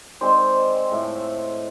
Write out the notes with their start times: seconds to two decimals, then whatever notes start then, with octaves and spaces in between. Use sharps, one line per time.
0.21 D#3 G#3 C4 C5 D5
0.91 A2 F3 A3